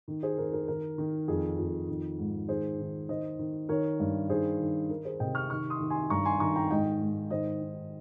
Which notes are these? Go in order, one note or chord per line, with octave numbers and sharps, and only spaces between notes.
D#3
G#4 C5
D#3 A#4
A#4
D#3 A#4
D#3
F2 G#4
F2
D#3
G#2
D#3 G#4 C5
D#3
D#3 C5 D#5
D#3
D#3 A#4 C#5
G2
D#3 G#4 C5
D#3
D#3 A#4
G#4 C5
C3 D#5 G5
C#6 F6
D#3 C#6 F6
C6 D#6
D#3
G#5 C6
G2 A#5 C#6
G#5 C6
D#3 A#5 C#6
G5 A#5
G#2 D#5 G5
G#2
D#3 C5 D#5
D#3